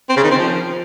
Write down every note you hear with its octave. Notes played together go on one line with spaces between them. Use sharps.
C4
C#3
D#3
C4
F3